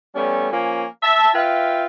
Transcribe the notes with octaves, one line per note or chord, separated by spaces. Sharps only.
G3 A3 B3 C#4
F3 A#3 C#4 G#5
E5 A5
F4 B4 E5 F5 G5